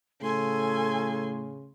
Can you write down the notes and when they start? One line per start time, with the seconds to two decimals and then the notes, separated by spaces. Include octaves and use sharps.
0.22 A2 C#3 A4 G#5 C6